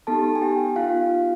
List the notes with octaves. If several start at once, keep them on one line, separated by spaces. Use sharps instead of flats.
B3 D#4 G4 A4 A5
G#5
G4 G5
B3 D#4 F4 G4 F5